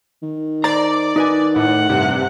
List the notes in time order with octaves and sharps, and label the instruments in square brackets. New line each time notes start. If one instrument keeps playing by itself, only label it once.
[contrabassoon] D#3
[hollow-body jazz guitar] C5 A#5 [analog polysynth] D5
[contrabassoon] D#3 [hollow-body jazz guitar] D#4 B4 G#5
[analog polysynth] A2 [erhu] F#5
[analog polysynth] G2 C3